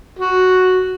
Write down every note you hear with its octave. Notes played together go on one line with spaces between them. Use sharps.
F#4